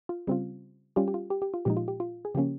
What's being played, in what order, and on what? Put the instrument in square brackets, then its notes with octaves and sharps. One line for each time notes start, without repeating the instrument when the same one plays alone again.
[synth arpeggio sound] F4
C#3 G3 C4 F4
G3 C#4 F4 G4
G4
F4
G4
G4
F4
A#2 F3 G#3 D#4 G4
F4
G4
F4
G#4
C#3 F3 A#3 C#4 G4